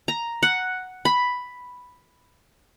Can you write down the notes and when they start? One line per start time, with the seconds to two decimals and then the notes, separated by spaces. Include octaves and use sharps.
0.08 A#5
0.43 F#5
1.05 B5